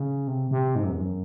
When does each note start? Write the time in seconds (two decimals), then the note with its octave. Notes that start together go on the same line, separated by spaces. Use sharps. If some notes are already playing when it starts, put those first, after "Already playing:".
Already playing: C#3
0.27 C3
0.51 C3
0.75 G#2
0.83 F#2
0.91 E2
0.99 F#2